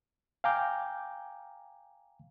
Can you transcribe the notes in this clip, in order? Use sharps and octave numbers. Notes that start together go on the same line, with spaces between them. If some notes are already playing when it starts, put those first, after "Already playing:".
F5 G5 G#5 A#5 D6 G6